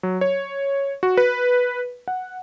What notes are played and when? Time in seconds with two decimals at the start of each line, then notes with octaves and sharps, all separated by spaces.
0.03 F#3
0.21 C#5
1.03 F#4
1.17 B4
2.08 F#5